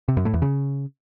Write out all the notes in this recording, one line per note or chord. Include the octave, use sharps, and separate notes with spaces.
C3
F#2
A2
E2
C#3